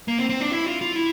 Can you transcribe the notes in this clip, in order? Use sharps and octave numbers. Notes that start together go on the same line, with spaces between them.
A#3
C4
C4
D4
E4
F4
F4
E4